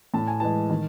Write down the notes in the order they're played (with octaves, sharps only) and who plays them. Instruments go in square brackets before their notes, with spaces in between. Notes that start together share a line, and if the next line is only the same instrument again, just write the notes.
[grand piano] A2 A5
G#5
E3 G#3 A5
D#3